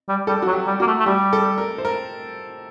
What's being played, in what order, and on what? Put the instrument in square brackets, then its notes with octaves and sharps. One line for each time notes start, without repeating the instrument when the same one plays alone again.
[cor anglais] G3
[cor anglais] G3 [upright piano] A4
[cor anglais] F#3 [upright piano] F#4
[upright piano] G4
[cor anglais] G3
[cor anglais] A#3 [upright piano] F#4
[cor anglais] A3
A3
[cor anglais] G3 [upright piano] G4
[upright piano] A4
A#4
C5
A#4